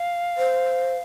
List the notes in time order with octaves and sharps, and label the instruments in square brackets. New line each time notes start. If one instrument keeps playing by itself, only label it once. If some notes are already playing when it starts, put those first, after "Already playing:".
Already playing: [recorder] F5
[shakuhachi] C5